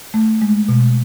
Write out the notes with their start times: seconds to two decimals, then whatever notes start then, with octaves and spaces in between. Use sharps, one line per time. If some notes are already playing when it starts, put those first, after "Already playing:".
0.14 A3
0.42 G#3
0.69 B2